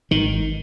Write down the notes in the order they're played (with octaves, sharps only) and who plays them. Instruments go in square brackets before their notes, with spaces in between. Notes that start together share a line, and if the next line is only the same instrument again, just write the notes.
[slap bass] G#1 D#3